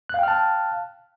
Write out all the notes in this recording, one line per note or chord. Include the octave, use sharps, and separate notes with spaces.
F5 G5 A5 F6 F#6